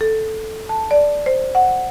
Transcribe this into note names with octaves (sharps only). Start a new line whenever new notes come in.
A4
A5
D5
C5
F#5